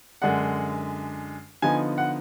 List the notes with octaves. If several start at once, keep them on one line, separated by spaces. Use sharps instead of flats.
F#2 D3 G#3 D4 F#5
D3 F3 B3 D#4 G#5
F#5